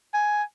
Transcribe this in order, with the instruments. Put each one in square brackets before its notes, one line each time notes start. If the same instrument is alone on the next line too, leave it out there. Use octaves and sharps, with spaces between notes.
[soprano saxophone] G#5